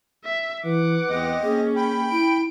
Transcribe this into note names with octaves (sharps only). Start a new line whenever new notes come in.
E5
E3 B4 F#5 D6
E2 C4 G4 D#5
A#3 C#4 G#4
G5 B5
E4 D7